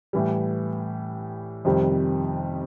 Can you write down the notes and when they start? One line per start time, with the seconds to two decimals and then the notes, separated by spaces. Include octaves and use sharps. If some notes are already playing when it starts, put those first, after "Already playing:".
0.13 A2 E3 G3
1.65 F2 C3 D#3 G3